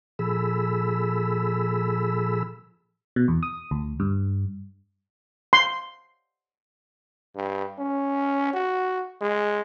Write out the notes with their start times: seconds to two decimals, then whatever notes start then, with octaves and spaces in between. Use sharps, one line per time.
0.19 A#2 F3 G#4 A4 B5 E6
3.16 B2
3.28 E2
3.43 D#6
3.71 D2
4.00 G2
5.53 C6
7.36 G2
7.79 C#4
8.54 F#4
9.22 G#3